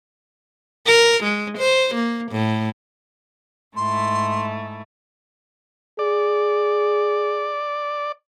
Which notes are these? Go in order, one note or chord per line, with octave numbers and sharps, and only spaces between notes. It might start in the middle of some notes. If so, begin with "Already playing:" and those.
A#4
G#3
C5
A#3
A2
G#2 A3 E4 C6
G#4 D5